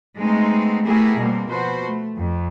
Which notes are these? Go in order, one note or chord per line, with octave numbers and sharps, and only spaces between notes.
G#3 A3 B3 C4 D#4
A3 B3 E4 G4 G#4 A#4
B2 G3 A#3 C4
B2 F3 F#4 B4 C5
A3
F2